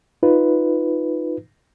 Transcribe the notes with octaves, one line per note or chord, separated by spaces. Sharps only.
D#4 F4 B4